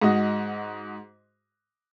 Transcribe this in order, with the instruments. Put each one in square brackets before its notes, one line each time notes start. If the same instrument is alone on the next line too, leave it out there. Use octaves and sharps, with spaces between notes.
[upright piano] G#2 G#3 F#4 D#5